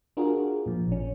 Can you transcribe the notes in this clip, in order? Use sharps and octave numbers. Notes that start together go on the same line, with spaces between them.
D4 F4 F#4 G#4 A#4
A#2 F3
A1 C#4